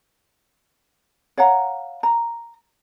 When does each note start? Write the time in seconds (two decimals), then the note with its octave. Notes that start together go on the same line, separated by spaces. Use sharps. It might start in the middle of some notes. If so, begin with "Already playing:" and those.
1.38 C#5 F5 F#5 A#5
2.03 A#5